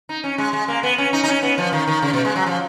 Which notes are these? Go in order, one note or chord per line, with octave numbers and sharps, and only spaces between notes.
D#4
C#4
G#3
G#3
A#3
B3
C#4
D#4
D#4
C#4
B3
F3
D#3
D#3
C#3
B2
G#3
F#3
F3